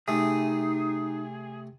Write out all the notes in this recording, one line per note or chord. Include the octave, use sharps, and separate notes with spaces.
C3 A3 D#4 G#4